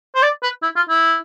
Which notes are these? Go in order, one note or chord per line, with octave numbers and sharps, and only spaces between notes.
C5
D5
B4
E4
F4
E4